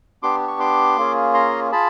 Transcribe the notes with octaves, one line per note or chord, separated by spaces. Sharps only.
B3 D4 G4 C6 D6
C#6
C6 D6
A#3 C#4 F4 G#4
A#5 C6
F4 G#4 A5 B5